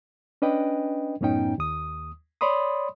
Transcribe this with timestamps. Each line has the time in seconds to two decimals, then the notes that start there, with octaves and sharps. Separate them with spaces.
0.42 C#4 D4 B4 D#5 G5
1.21 F#2 A2 B3 C#4 D#4 G5
1.58 D#2 D#6
2.41 C#5 D5 B5 C6 D#6